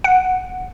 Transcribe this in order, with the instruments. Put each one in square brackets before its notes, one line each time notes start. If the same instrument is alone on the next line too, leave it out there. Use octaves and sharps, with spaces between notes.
[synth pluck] F#5